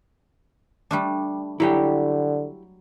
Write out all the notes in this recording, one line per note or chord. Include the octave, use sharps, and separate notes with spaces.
G3 A3 D4
D3 F#3 G3 E4 G4 G5